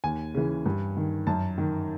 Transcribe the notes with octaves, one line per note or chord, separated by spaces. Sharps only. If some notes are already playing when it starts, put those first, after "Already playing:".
D#2 G#5
C#3 E3
G2
D#3
F#2 A5
D#3